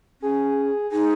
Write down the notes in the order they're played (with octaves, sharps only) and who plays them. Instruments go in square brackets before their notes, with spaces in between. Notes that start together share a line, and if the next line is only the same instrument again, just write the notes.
[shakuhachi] C#4 [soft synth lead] G#4
[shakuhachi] D#4 [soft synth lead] G#4